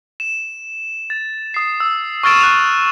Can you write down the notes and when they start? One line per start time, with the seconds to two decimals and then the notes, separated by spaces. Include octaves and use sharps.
0.20 E7
1.10 A6
1.54 D#6 C7
1.80 E6
2.23 C#6 E6 F6 A6 D7 E7
2.40 F#6 A6 F7